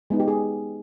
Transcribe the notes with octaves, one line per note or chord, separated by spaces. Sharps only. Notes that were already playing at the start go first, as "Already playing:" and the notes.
G#3 B3 D#4 G#4
G4
G#4